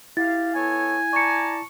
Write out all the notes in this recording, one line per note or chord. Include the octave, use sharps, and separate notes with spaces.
E4 G4 F5 A6
B3 A4 C#5 G#5
D5 A5 A#5 C#6 C#7